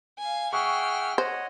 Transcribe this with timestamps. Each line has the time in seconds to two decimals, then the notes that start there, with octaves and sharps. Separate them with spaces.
0.19 F5 G#5
0.53 G#4 E5 F#5 G5 C#6 F6
1.18 C5 C#5 D#5 F#5